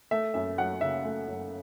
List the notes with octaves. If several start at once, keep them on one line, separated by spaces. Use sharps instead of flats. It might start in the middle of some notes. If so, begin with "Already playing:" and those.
A3 E5
F#2 E5
F#3 F#5
C#3 E5
A3
F#2